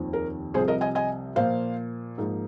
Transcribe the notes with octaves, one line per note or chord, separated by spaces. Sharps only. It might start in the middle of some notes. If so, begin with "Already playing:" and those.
Already playing: F1 D#2 D#3 C4 F4
A#4
C2 C3 F3 G#4 C5
A#4 D#5
D#5 G#5
D#5 G#5
A#2 F3 A#3 C5 F5
G#2 F3 A#3 D#4